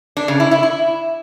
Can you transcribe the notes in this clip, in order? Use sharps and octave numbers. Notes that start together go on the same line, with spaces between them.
D4
C#3
E4
E4
E4